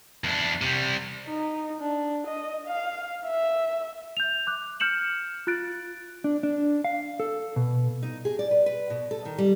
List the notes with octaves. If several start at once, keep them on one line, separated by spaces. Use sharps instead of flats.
E2 D4
C3 G3
D#4
D4
D#5
F5
E5
G6 F7
D6 F#6
F6 G6 C#7 E7 F#7
F4 F#6 A6 D7
D4
D4
F5
A4
B2
D#4
G#4
D5
B4
B4
B2
A4
D#3
G3